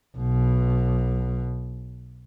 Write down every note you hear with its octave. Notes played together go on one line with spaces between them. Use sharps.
B1 B2